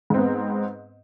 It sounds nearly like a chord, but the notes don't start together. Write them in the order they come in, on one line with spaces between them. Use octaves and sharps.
G#2 C4 B3